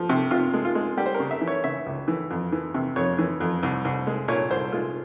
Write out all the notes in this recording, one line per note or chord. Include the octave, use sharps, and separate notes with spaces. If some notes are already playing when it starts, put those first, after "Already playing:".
Already playing: F3
C3
C3 F4
G#3
F4
G#3
G3 G4
C5
A#4
C#3
E5
E3
C#5
C#3 E5
C#2
E3
F2
E3
C3
F2 C#5
E3
F2
C2
C2
G#3
A#2 C#5
C2 C5
G#3 F4